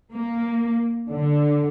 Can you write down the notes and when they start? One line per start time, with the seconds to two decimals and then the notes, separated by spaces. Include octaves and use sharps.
0.12 A#3
1.09 D3